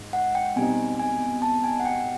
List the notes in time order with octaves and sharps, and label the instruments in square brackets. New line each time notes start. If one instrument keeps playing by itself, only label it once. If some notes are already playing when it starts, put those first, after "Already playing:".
Already playing: [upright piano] G#2
[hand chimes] F#5
G5
[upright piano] B2 G3 C4 D#4 [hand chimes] G#5
[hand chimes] G#5
A5
G#5
F#5
G5